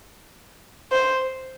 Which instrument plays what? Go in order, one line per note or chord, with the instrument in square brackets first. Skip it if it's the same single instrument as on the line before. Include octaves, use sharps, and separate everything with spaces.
[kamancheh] C5